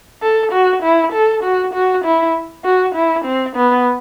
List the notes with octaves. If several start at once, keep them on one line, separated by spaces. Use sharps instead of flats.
A4
F#4
E4
A4
F#4
F#4
E4
F#4
E4
C4
B3